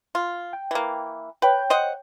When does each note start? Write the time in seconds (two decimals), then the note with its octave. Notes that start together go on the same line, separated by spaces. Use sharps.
0.15 F4
0.53 G5
0.71 E3 A#3
1.42 B4 C#5 G5 G6
1.70 C5 D#5 F#5